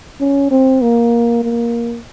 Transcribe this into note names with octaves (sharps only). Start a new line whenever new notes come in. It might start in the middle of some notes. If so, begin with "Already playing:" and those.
C#4
C4
A#3
A#3